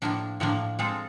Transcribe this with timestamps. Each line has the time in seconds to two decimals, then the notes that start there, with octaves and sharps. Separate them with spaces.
0.02 A2 F3 A#3 D4
0.40 A2 F3 A#3 D4
0.79 G#3 C4 F4 A4